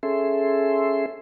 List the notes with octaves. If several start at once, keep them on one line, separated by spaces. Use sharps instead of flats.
C#4 G#4 A4 E5 C6